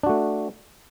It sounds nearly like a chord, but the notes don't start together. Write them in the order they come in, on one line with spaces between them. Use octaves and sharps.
D4 F#4 A3